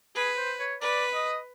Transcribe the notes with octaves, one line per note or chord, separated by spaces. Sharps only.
G#4 B4
C5
C#5
B4 D5
D#5